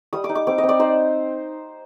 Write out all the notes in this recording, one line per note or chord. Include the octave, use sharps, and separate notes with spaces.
G3 D#6
D6
D#4
D6
C4 D6
D#5
C4
D5
D#4 C5